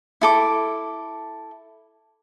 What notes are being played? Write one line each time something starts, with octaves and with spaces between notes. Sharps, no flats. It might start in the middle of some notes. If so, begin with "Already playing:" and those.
E4 A4 D6